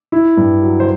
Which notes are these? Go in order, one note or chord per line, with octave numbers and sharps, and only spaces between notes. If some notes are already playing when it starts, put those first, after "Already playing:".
E4
G2
F#3
C5